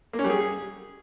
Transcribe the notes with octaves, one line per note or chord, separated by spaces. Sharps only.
A#3
C#4
G3
G#4